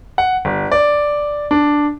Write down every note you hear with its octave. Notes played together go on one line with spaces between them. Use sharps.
F#5
G1
D5
D4